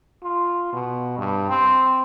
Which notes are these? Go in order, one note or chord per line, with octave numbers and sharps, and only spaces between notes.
F4
B2
G2
C4